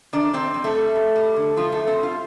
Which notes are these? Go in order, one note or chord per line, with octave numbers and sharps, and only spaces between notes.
D#3 D4 D5
F2 C4 C5
F2
A3 A4
G3
F2
G3
D3
F2 F3 F4
A3 A4
F2
C4 C5
G3
F4 F5